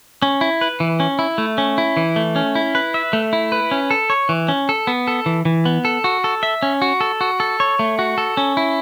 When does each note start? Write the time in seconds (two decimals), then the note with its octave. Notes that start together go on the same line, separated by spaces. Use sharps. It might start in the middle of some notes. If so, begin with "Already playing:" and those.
0.22 C#4
0.41 E4
0.61 B4
0.80 E3
1.00 C#4
1.19 E4
1.38 A3
1.58 C#4
1.78 E4
1.97 E3
2.16 A3
2.36 C#4
2.55 E4
2.75 B4
2.94 E5
3.13 A3
3.33 E4
3.52 B4
3.71 C#4
3.91 A4
4.10 C#5
4.29 E3
4.49 C#4
4.69 A4
4.87 B3
5.08 A4
5.26 E3
5.45 E3
5.65 B3
5.85 A4
6.04 F#4
6.24 A4
6.43 E5
6.63 C#4
6.82 F#4
7.01 A4
7.21 F#4
7.40 A4
7.60 C#5
7.79 A3
7.99 F#4
8.18 A4
8.37 C#4
8.57 E4